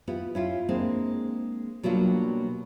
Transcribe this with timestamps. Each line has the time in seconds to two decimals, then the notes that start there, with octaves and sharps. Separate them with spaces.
0.08 B3 E4 F4 G4
0.35 C#4 E4 F4
0.69 G#3 A#3 C4 D4
1.83 B2 F#3 G3 A#3 D4 F4